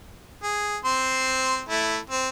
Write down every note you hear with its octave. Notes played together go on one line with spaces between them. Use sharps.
G#4
C4 C6
A3 E4
C4